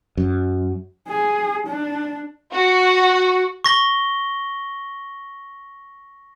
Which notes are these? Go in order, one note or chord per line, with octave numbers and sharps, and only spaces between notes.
F#2
G#4
D4
F#4
C#6 A#6 G7